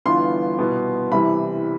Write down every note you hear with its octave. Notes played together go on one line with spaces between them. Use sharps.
G1 G2 E3 B3 F4 C6
C2 B2 B3
C2 C3 E3 G3 B5